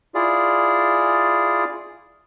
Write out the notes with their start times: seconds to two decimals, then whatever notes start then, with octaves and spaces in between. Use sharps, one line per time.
0.15 E4 F4 G#4 D5